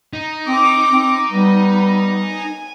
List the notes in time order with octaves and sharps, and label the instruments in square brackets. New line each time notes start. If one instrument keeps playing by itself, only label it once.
[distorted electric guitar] D#4
[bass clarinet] C4 [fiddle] D6
[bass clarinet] C4
[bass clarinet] G3 [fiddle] B3
[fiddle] G#5